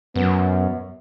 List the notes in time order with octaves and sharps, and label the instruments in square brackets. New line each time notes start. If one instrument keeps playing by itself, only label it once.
[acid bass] F#2 [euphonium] B3